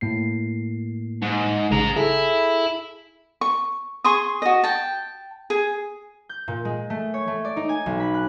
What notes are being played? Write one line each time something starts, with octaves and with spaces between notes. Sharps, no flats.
A2 A#3 C7
G#2
A1 C#3 G#4 A#5
E4 G#4 A4
C#6
G#4 C6 C#6 D#6
F#4 D#5
G5 A5
G#4
G6
A#2
G#3
A3
C#5
A3
D5
D#4
G#5
B1
B5
F#6